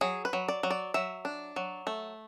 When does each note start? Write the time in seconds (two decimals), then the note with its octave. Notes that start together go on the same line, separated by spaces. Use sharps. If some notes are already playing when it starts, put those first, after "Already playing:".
0.01 F#3 G#4
0.25 B4
0.33 F#3
0.49 D5
0.63 F#3
0.70 D5
0.94 F#3 E5
1.25 D4
1.56 F#3
1.87 A3